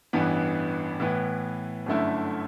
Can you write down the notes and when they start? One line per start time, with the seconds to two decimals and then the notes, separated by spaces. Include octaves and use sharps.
0.13 A1 G2 E3 B3
1.00 A2 E3 B3
1.86 G1 F#2 D3 A3 E4